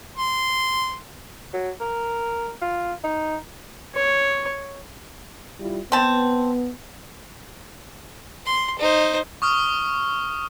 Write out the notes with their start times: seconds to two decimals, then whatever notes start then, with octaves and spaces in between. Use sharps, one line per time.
0.17 C6
1.53 F#3
1.80 A#4
2.61 F4
3.04 D#4
3.95 C#5
5.60 G3 E4 F4
5.92 B3 C4 A5
8.46 C6
8.79 D#4 C5
9.42 C#6 D#6 F6